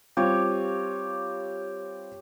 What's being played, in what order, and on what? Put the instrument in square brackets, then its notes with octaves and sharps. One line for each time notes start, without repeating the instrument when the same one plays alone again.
[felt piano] G3 C4 F4 [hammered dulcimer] G4 C#5